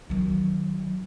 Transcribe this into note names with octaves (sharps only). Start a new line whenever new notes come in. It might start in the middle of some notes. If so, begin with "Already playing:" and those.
D#3 F#3